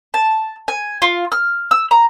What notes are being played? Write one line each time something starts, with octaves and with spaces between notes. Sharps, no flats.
A5
G#5
F4
F6
E6
A#5